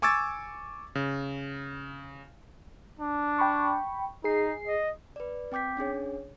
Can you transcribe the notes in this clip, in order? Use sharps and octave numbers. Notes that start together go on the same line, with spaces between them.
G#5 C#6 D6 E6 G#6 A6
C#3
D4
G5 B5 C#6
D#4 G#4 C7
D#5
B4 D5
C4 G5 D6 G6 B6
C#4 D4 G#4 C#5